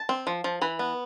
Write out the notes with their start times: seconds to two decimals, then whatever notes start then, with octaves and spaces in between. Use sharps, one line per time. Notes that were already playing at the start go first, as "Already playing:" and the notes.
Already playing: A5
0.09 C4
0.27 F3
0.44 F3
0.61 E3 B5
0.79 B3